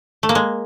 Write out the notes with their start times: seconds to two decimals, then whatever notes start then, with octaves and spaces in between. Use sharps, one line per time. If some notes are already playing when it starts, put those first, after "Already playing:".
0.23 A3
0.29 A#3
0.35 G#3